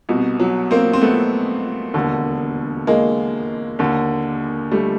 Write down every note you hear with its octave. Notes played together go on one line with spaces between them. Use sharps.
C2 B2
F#3
A#3 C4
C4
A3 B3
E1 D#2 D3
G#3 A#3
D#2 D3
G3 A3